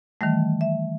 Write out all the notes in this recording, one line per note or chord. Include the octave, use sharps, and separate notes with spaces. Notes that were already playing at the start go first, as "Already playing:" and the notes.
D#3 E3 G3 A3
E5